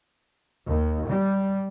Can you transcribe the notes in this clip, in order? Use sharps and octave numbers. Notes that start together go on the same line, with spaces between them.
D#2
G3